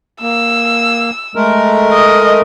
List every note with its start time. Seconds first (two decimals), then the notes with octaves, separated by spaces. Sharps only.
0.22 A#3 E6
1.36 G#3 A3 A#4
1.93 D#5